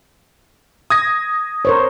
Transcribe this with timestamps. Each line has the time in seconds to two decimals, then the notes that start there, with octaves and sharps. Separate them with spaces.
0.90 D#6 G#6 A#6
1.65 A#4 C5 C#5